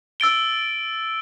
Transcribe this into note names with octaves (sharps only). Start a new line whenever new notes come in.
E6 A6 D7 G7